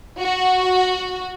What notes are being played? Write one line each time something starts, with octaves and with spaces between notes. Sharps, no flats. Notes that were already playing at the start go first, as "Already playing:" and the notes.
F#4